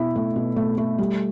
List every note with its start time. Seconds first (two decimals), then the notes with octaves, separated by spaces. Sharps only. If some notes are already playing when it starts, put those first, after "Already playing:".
Already playing: B2 E4
0.16 A3
0.36 B2
0.56 A3
0.78 A3
0.98 G3